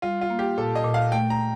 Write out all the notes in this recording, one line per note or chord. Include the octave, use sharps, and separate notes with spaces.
G3 F4
F4
A#3
G4
A#2 A4
D#5
A#2
F5
A3 G5
A#5